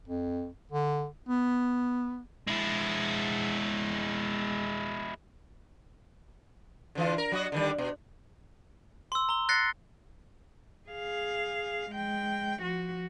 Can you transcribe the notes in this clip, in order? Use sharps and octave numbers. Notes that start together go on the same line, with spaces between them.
F2
D3
B3
G#3 E4
D3 E3 F4
A#4
F#3 F#4 D#5
D3 D#3 G3
B2
C6 E6
A#5 G7
F#6 A6 A#6 C7 C#7
G#4 F5
G#3 G5
F3 F#4